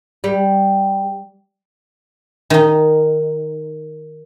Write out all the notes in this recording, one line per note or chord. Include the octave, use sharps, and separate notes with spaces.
G3
D#3 D#4